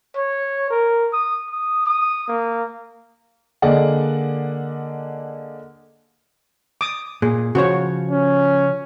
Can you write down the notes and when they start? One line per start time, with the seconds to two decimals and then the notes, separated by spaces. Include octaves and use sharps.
0.16 C#5
0.70 A#4
1.13 D#6
1.51 D#6
1.86 D#6
2.28 A#3
3.62 D3 A#3 G#4 D5 D#5 F#5
6.81 D6 D#6
7.22 A#2 G#4
7.55 C#3 F3 F#4 C5 C#5
8.11 C#4